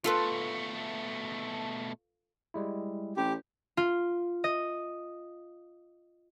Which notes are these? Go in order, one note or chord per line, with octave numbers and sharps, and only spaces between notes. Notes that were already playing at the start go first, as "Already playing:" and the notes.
B2 A3 F4 A4 B4
G3 G#3 E4
A1 G4
F4
D#5